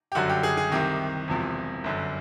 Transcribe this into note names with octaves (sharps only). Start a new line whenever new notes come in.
G4
G1 F#2 D3 F#3 F#4
G4
G#4
G#4
C2 C3 D#3 G4
E1 E2 C3 F3
G1 F#2 D3